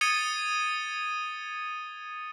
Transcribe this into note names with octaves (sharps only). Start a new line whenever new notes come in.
D#6 G#6 A6 C#7 D#7 G7